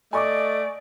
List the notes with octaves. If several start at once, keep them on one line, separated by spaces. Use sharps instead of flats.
A3 D5 D#5 G#5 C#6 D6